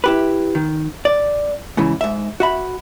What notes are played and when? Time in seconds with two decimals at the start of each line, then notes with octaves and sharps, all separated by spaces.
0.04 E4 G4 B4
0.55 D#3
1.05 D5
1.77 G#2 C#3 E3
2.01 G#2 E5
2.40 F#4 E5 B5